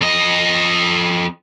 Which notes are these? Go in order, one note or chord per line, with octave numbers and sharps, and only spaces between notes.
F2 D#5